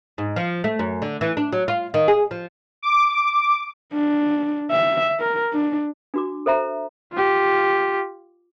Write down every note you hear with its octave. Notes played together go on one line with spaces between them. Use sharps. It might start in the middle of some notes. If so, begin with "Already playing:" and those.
G#2
F3
A3
F#2
D3
E3
D4
F#3
F4
D#3
G#4
F3
D6
D4
E5
A#4
D4
D4 F#4 D6
A4 C5 E5 A#5
F4 G4